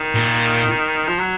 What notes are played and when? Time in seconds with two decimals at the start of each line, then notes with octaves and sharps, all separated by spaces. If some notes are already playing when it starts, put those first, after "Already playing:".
Already playing: D#3
0.15 A#2
1.08 F3
1.19 F#3